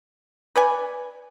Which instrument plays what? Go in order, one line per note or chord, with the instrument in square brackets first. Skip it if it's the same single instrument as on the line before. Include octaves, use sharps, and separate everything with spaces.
[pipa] B4 D5 G#5